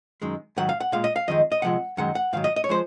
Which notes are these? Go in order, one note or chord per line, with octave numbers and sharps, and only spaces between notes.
F#2 D#3 G#3
G#2 D#3 F#3 F#5
F5
F#5
A#2 G#3 F5
D#5
F5
F2 D#3 G#3 D#5
D#5
C3 F3 G#3 F#5
F#2 D#3 G#3 F#5
F#5
G#2 D#3 F#3 F5
D#5
D#5
C#5
F3 G#3 C5